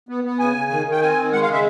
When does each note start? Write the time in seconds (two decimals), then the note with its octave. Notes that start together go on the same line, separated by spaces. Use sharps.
0.09 B3
0.24 B3
0.39 C#3 G#5
0.55 C#3
0.70 D#3
0.86 D#3
0.92 G5
1.01 C4 G#5
1.17 D#3
1.32 G#3 F#5
1.42 F5
1.47 C#3
1.53 E5